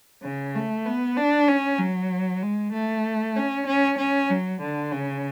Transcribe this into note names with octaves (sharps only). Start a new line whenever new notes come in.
C#3
A3
B3
D4
C#4
F#3
G#3
A3
C#4
C#4
C#4
F#3
D3
C#3